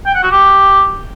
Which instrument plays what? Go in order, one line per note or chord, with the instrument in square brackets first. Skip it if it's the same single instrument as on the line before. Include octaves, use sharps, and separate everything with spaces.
[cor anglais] G5
F#5
F#4
G4